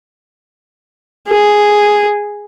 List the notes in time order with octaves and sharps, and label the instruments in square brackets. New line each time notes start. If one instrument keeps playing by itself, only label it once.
[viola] G#4